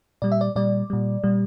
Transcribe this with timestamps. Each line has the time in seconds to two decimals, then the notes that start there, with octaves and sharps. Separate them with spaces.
0.22 A#2 G3 D5
0.32 E5
0.41 D5
0.56 A#2 G3 D5
0.90 A#2 G3
1.24 A#2 G3